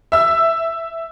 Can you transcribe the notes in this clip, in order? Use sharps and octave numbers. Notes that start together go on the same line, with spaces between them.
E5 E6